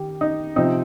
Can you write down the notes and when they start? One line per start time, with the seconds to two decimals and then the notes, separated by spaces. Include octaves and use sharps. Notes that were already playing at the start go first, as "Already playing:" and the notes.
Already playing: D#3 G4
0.21 D#4
0.56 C3 F3 C4 D#4